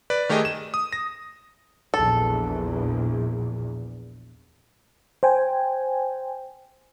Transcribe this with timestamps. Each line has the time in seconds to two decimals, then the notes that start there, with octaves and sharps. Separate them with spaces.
0.10 B4 D5
0.29 D#3 A3 G4 G#4 D#5
0.45 E7
0.74 D#6
0.93 A#6
1.94 A#1 E2 A4
5.23 C5 G5 G#5